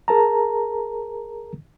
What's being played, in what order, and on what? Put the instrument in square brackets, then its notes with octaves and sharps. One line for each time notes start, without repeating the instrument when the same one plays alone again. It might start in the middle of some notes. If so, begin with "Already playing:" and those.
[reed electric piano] G#4 A#4 A5 A#5